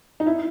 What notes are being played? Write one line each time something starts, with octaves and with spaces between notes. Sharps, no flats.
D#4
E4